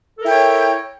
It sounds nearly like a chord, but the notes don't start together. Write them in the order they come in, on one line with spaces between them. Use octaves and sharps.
A4 A#4 E4 G5 C#5